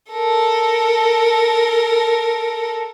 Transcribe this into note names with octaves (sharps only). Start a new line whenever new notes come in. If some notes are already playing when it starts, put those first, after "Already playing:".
A4 A#4